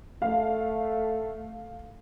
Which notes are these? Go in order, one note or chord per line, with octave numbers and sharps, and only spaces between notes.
A3 F5